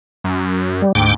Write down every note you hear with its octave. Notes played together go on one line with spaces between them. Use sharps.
F#2
G3
D2 G#2 G5 D6